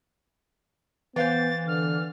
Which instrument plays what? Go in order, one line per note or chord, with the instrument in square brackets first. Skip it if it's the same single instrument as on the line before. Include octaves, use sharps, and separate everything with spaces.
[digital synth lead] E3 [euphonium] B3 [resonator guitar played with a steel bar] C5 F5 G5 [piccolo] A6
[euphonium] D3 [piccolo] F6